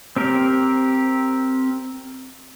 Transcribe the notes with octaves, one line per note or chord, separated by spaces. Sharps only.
C4 G4 A#4